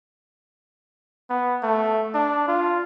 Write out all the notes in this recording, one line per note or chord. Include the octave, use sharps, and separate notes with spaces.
B3
A3
D4
F4